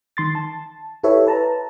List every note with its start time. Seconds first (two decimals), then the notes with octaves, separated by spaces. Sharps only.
0.17 D#3 C6 A6
0.35 A5
1.04 E4 G4 A4 B4 C#5 E5
1.27 B4 A5 A#5